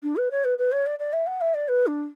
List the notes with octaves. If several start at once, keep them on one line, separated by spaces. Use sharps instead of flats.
D4
B4
C#5
B4
B4
C#5
D5
D5
E5
F#5
E5
D5
B4
D4